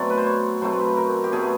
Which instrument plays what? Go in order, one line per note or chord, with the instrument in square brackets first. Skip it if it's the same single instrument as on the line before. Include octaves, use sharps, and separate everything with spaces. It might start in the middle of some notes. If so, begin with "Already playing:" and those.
Already playing: [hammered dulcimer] B2 F#3 A3 C4 D5
B4
C5
C#5
B2 F#3 A3 C4 C5
B4
A#4
G4
B2 F#3 A3 C4 G#4